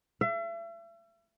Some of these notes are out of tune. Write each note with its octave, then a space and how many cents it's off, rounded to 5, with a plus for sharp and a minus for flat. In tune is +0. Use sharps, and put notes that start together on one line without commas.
E5 +40